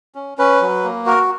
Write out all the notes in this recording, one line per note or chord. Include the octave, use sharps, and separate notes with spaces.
C#4
C#4 B4
F#3
A#3
F#4 A#4